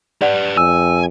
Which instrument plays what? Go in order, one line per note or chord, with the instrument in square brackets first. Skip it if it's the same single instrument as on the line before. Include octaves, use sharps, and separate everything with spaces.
[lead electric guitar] G4 B4 [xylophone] D5 F#5
[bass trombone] F2 [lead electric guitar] G#5 [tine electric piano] E6